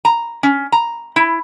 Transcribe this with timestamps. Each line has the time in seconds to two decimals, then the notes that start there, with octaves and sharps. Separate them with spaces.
0.05 A#5
0.43 C#4
0.72 A#5
1.16 E4